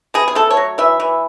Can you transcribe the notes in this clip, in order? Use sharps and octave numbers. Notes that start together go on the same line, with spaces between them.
B2 G#4
G#4
A3 A4
C#5
F#3
E3 E5
E3